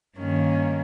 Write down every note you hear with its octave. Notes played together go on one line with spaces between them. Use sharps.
G2 D#3 A#3 C#4